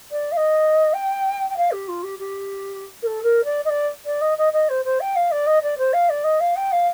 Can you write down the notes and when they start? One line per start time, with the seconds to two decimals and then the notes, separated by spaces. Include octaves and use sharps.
0.11 D5
0.32 F5
0.36 D#5
0.93 G5
1.49 G5
1.57 F5
1.71 G4
1.88 F4
2.03 G4
2.19 G4
3.02 A#4
3.06 A4
3.23 A#4
3.44 D5
3.65 D#5
3.69 D5
4.05 D5
4.21 D#5
4.38 D#5
4.53 D#5
4.69 C5
4.84 C5
5.00 G5
5.15 F5
5.31 D5
5.46 D#5
5.62 D5
5.78 C5
5.93 F5
6.09 D5
6.24 D#5
6.40 F5
6.56 G5
6.71 F5